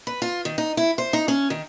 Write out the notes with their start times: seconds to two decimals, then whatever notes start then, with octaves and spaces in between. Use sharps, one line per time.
0.07 B4
0.22 F4
0.45 D#3
0.58 D#4
0.77 E4
0.98 C5
1.13 D#4
1.28 C#4
1.50 D#3